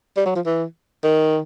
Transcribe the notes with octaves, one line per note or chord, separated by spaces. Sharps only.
G3
F#3
F3
E3
D#3